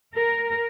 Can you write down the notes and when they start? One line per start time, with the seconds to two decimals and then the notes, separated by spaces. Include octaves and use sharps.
0.14 A#4